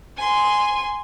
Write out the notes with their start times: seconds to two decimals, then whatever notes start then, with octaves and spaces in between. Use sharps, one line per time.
0.16 G#5 C6